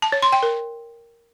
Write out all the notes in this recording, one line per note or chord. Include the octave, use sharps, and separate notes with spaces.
A5
C#5
C6
G5
A#4